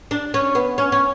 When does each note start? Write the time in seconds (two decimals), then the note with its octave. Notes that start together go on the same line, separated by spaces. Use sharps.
0.11 D4
0.34 C#4
0.55 B3
0.78 C#4
0.92 C#4